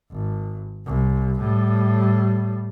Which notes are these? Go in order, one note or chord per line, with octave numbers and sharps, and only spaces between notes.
G#1
C2
A2 G3